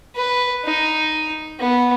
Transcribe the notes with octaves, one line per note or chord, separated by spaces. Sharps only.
B4
D#4
B3